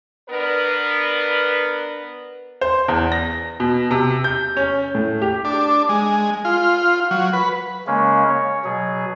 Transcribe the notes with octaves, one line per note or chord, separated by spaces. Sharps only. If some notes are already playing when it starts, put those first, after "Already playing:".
B3 D4 A#4 B4
C5
E2
A#6
B2
C3
G6
C#4
A2
G4
D4
G#3
F4
F#3
B4
C#3 G#3 A#3 C#4
C#5
B2 F#3 G#4